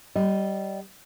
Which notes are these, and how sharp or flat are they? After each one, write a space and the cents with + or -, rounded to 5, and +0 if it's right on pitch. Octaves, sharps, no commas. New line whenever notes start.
G3 -20 D#5 +0